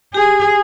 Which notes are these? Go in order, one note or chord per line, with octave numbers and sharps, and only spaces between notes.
G4 G#4